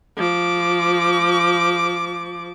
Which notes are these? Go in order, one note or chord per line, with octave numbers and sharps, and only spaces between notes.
F3 D6